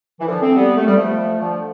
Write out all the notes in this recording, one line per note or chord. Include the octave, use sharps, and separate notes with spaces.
E3
D3 F3
A3 C4
G3 B3
A3
G3
F3 A3
D3 F3